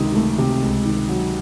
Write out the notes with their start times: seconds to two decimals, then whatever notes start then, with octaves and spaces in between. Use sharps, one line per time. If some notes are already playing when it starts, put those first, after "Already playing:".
Already playing: C#2 C3 D#3 D#6
0.15 A3
0.38 C3
0.62 C#2
0.85 D#3
1.09 F#3